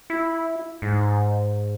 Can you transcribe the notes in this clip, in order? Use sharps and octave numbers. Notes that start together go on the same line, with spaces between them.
E4
G#2